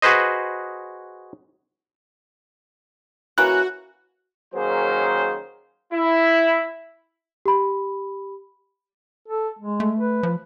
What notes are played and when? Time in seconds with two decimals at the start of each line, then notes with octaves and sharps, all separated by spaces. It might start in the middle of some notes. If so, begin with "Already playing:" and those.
0.02 F#4 G#4 B4 C5 D#5
3.38 E3 A#3 C#4 F#4 F#6
4.55 D#3 F#3 A#3 C#4 G#4 C5
5.93 E4
7.46 G4 B5
9.28 A4
9.59 G#3
9.80 A3
9.98 B4
10.23 F3